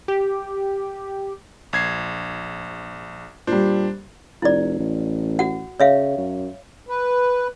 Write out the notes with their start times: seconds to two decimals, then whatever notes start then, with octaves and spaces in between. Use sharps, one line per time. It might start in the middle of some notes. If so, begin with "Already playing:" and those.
0.08 G4
1.73 A#1 G#6 C7
3.47 A#2 G3 D4 C5
4.42 F1 E4 D5
4.79 A1
5.39 F#4 F#5
5.80 C#3 C#5 E5 F5
6.17 F#2
6.89 B4